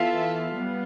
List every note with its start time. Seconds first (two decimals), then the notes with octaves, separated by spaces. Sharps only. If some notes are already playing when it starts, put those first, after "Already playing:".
Already playing: E3 B3 F4 A4 E5 F5
0.54 G3 B3